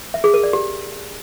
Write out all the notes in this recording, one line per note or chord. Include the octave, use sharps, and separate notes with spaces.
E5
G#4
A#4
D5
G4